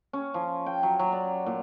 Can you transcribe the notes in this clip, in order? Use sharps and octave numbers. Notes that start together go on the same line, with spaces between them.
C#4
F3
G5
F#3
F#3
D5
A#2